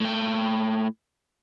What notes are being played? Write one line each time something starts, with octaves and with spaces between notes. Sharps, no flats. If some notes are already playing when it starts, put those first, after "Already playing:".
A2 G5